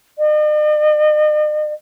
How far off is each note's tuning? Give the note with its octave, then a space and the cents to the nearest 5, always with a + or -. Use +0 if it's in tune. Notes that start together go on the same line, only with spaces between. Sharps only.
D#5 -45